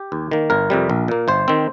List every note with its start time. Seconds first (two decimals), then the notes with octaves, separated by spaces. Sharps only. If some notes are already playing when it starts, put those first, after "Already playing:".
Already playing: G4
0.12 D#2
0.31 D#3 A#3
0.50 G1 A#4
0.70 F2 C3 G3
0.90 A#1
1.08 A#2 A#3
1.28 G1 C5
1.48 D#3 C4